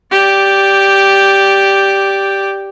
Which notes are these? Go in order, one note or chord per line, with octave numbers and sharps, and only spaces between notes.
G4 D5